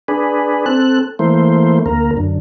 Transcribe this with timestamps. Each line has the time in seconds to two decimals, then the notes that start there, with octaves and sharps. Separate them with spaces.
0.08 D4 G#4 B4
0.66 C4 A4 F#6
1.19 E3 A3 A#3 C5
1.86 D2 A#3 A#4
2.17 F#2 D3